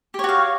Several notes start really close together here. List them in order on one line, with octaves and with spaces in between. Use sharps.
G4 C#5 F#4 F5